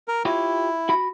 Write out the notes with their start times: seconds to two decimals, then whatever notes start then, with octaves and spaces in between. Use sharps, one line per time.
0.08 A#4
0.25 E4 F4 G4 C#5
0.89 F#4 B5